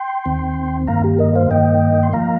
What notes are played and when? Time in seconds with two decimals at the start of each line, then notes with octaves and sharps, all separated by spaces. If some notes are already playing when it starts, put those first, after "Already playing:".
Already playing: G5 C6
0.26 D#2 D#3 C4
0.87 G2 D#3 A#3 F5 A#5
1.04 G4
1.19 A#4 D#5
1.35 C5 F5
1.50 G2 D#3 A#3 D#5 G5
2.03 C6
2.13 F3 A#3 F5 A#5